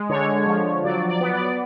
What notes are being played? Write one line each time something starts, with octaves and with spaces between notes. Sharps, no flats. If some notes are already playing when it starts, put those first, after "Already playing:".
Already playing: G#3
D3 C#5
F3
F#3 D5
D5
B3
D5